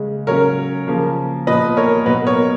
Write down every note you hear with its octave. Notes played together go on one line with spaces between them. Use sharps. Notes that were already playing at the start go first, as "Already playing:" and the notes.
Already playing: C#3 G#3 C#4
C#3 F#3 C#4 A#4 C#5
C#3 F3 A#3 C#4
A#2 F3 B3 B4 D#5
A#4 C#5
B2 F#3 B3 B4 D#5
A#4 C#5